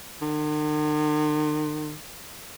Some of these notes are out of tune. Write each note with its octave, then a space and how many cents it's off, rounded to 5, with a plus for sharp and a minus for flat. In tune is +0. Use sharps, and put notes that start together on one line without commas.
D#3 -45